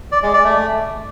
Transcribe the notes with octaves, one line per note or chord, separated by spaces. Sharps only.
D5
G#3
D5
A3